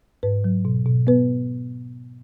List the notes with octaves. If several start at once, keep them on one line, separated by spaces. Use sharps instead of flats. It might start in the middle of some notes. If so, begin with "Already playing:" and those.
G#2 B4
F#3
B2
B2
B3 B4